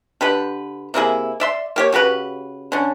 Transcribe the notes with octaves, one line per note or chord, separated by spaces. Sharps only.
D3 G4 B4
C3 A#3 E4 G#4
D5 E5 C6
A#3 G4 C#5
C#3 F#4 G4 B4
D3 C#4